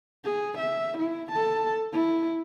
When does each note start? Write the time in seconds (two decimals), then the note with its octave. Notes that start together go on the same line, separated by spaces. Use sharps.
0.25 G#4
0.59 E5
0.98 E4
1.32 A4 A5
1.93 E4